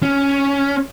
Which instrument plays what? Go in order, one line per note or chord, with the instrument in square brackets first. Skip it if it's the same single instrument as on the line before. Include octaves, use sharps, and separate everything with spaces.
[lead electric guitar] C#4